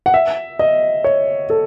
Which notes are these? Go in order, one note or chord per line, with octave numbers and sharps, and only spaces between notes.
F#5
E5
D#5
C#5
A4